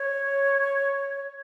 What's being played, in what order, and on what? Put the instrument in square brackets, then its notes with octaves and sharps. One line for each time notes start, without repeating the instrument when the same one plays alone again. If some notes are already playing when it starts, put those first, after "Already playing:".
Already playing: [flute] C#5